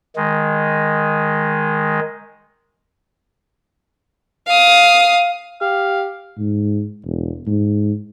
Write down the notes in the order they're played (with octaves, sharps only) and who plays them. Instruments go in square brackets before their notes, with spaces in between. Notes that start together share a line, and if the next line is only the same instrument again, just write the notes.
[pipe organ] D#3 G#3
[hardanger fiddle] F5 D#6
[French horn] G4 [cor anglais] F5
[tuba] G#2
E1
G#2